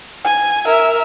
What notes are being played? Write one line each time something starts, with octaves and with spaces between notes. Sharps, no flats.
G#5
A#4 E5